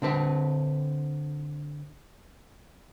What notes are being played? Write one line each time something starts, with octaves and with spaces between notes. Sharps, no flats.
D3 C4 B4